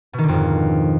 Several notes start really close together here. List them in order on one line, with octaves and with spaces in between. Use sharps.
B2 D#3 D3 F2 G#2